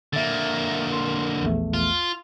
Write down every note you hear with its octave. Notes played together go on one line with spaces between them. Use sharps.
D3 A#3 E5 A6
C6
A#1 E2 A3
F4